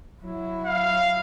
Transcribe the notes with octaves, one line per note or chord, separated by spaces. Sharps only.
F#3 E4
F5